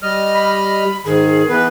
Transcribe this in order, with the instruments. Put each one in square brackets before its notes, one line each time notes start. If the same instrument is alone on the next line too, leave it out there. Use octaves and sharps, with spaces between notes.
[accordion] G3 D#5 F6
[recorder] B5
[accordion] G#2 D#3 [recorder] G#4
[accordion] E3 B3 B4